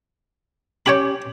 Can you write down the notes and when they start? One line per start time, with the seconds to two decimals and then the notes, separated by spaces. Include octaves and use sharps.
0.86 C#4 G4 C#5 G5 G#5 B5